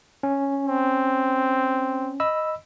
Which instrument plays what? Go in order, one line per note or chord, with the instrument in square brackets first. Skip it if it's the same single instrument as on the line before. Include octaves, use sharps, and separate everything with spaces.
[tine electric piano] C#4
[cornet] C4
[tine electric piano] D#5 B5 E6